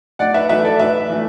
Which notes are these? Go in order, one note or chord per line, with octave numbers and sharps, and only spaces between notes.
A2 D5 F#5
B4 E5
E3 A3 B4 E5
A4 D5
A2 B4 E5
E3 A3